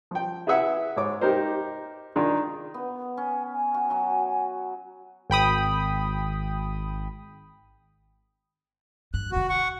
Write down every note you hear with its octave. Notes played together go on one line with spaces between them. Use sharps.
F3 G5
E4 G#4 B4 E5 F#5
G#2 C#5 D6
D#4 G4 A#4 C5
D#3 D4 D#4 F4 G#4
B3
C#4 G#5
G#5
F#4
F#3 F#4
G#1 G5 B5 D#6
G2 F#6
F1 D#3 F#4
F#5 C#6